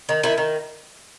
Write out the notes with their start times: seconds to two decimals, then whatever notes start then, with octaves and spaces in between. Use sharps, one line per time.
0.09 D#3
0.23 D#3 E4
0.38 D#3